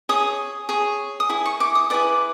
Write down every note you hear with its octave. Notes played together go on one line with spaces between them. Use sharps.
G#4 C#5 D#6
G#4 C#5
D#6
E4 G#4
C#6
D6
D#6
E4 G#4 B4 D5 D6